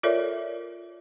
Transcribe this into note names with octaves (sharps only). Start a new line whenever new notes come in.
F4 A4 A#4 C#5 D5 E5